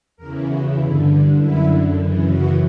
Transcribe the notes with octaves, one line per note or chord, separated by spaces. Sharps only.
E2 C#3 E3 A#4
F#4
G2 D3 E4
D4
F#2 D3 E4
F#2 C#3 E3
F#4